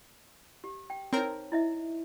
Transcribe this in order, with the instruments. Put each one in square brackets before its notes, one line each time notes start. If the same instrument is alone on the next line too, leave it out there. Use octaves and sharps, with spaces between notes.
[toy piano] G4
G5
[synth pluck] C4 A#4 [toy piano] D#4 C#5
[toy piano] E4 D#5 E5